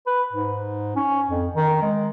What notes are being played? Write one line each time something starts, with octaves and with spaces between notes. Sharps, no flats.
B4
G#2
C#4
F2
D#3
G#3